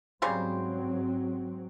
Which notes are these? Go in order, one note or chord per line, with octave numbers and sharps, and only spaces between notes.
G#2 C#3 F#3 G3 C4 C5